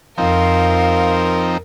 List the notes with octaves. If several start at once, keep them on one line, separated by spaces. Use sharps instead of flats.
F2 F3 C4 D#4 A#4 F5